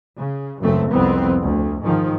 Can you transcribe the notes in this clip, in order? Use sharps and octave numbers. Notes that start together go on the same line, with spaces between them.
C#3
G#1 C#2 F#2 A3 C4
C2 F2 B3 C4
D2
G#2 D#3 F3